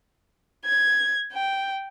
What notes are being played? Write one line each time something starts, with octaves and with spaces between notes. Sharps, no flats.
G#6
G5